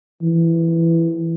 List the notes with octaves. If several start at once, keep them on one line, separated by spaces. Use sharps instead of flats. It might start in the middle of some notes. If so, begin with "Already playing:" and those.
E3